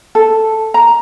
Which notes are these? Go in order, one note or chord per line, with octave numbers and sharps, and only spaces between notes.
A4
A#5